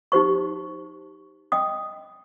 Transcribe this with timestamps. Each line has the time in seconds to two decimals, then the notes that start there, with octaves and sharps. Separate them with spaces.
0.12 D#4 G4 C5 C#6
1.52 D#5 G5 D#6